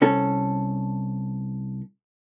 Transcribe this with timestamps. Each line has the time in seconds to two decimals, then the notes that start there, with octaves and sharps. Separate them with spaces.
0.02 C2 C#4 A4